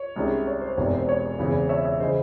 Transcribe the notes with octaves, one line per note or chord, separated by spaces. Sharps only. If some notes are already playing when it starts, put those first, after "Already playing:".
Already playing: C#5
C2 C3 D#3 G#3 C#4
C#5
C5
E1 E2 C3 D#3 C#5
C5
C#5
E2 C#3 E3 C4 E4
C#5 E5
C#5 E5
C#3 E3 C5 D#5